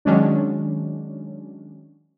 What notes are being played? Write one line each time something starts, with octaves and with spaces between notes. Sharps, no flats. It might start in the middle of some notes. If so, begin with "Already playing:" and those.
D#3 F#3 G#3 C#4 D4